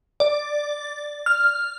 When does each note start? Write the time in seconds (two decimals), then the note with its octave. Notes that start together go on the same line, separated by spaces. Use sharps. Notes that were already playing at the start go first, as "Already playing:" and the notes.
0.20 D5
1.26 F6